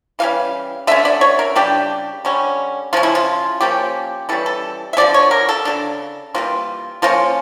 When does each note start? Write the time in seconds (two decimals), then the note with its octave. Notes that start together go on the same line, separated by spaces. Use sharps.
0.19 E3 G3 C#4 F5
0.87 D3 A3 C#4 E5
1.05 D5
1.21 C#5
1.39 A#4
1.55 C#3 G3 D4 G4
2.25 D3 G3 C#4
2.93 C#3 F3 C#4 F4
3.03 E4
3.15 F4
3.61 F3 A#3 C#4 G4
4.29 E3 G3 C#4 A4
4.46 A4
4.93 E5
4.97 D3 F3 C#4 D5
5.14 C#5
5.31 A#4
5.49 A4
5.65 C#3 G3 D4
6.34 E3 G3 A#3 C#4 F4
7.02 F3 A#3 C#4 F4